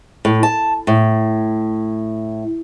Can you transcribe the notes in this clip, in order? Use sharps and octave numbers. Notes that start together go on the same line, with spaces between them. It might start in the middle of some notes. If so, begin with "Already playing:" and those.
A2
A5
A2